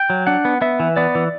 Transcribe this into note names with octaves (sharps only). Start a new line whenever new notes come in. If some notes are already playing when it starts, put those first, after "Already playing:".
Already playing: G5
F#3
D4 F#5
B3
B3 E5
E3
B3 D5
E3